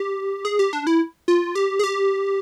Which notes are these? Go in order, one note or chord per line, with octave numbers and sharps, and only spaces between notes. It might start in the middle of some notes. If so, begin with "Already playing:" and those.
Already playing: G4
G#4
G4
D4
E4
F4
G4
G#4
G4